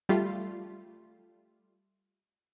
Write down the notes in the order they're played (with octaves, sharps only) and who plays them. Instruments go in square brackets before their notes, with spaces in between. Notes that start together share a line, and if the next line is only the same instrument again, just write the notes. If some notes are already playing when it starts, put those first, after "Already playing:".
[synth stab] G3 A3 F4